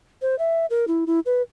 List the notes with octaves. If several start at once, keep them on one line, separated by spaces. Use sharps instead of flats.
C5
E5
A#4
E4
E4
B4